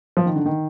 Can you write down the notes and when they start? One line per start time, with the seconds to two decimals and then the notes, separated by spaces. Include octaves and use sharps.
0.17 F3
0.26 D#3
0.36 D3
0.46 D#3